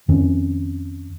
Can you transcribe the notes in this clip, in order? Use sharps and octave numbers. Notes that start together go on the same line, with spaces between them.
F2 D#3 C4 C#4